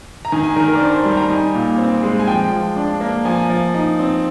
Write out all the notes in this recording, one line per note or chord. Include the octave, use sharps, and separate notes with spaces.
A#5
D#3 G#5
G#5
D#3 A#4
A#4
D5
D4 C5
C5
G3
A#5
D#4 G#5
A#2
C4
G#3
G#5
F3 G5
F3
D4
A#3
F3 G#5
F3
D#4
C4